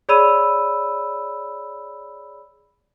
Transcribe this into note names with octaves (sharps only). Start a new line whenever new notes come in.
G#4 C#5 D5 B5 E6 D#7